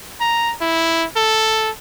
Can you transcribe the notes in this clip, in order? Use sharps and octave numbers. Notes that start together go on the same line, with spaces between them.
A#5
E4
A4